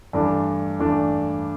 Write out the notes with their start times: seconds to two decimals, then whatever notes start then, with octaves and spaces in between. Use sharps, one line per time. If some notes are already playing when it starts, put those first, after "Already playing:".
0.13 G2 E3 A3 D4
0.79 G2 E3 A3 D4